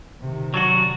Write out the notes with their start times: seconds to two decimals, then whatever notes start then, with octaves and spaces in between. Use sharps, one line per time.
0.21 C3 D#3
0.54 F#3 D4 F#4